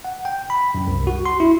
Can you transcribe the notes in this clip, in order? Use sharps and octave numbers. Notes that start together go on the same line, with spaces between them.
F#5
G5
B5
F#2
C2
F#4
C6
E4